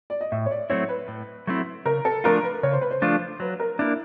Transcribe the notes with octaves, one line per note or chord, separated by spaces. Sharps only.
D5
D#5
A2 E5
C#5
D5
F#3 A3 C4 E4 C#5
B4
A2
F#3 A3 C4 E4
C#3 A#4
A4
F3 A3 D4 F4 A#4
B4
C#3 C#5
C5
B4
C5
F3 A3 D4 F4
F#3 B4
A#4
A#3 D4 E4